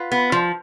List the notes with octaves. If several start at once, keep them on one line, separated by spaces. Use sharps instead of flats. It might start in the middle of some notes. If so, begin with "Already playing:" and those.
Already playing: F4 B4 F#5 B5
B3
F3